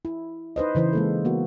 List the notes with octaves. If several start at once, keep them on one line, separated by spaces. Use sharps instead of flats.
E4
D#4 B4 C5 D#5
C#3 E3 E4 C5
G#3 A#3 A4
A#3 B3 F#4